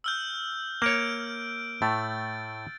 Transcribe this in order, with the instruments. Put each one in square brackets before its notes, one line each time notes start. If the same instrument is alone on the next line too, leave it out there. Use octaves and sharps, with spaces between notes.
[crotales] E6 F6 G6
[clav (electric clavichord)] A#3 C#5 [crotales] G6 D7
[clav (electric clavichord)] A2 A3 [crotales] A6